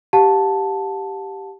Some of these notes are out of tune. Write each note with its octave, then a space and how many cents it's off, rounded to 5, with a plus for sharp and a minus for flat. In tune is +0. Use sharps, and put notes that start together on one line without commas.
G4 +0 F#5 -45 A5 +0